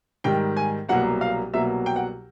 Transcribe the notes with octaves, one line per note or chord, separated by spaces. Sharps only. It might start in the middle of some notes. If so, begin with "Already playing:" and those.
G#2 D#3 G3 G5
G#5
C2 B2 F#3 A#3 F#5
F5
C2 B2 F#3 A#3 E5
G5
F#5